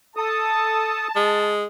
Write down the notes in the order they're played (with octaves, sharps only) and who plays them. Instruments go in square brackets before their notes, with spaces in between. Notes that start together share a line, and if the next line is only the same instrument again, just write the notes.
[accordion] A4 D#6 [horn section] A5
[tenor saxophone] G#3